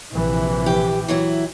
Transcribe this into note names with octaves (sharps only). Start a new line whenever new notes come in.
A#1 C3 E3
G4
E3 F#3 E4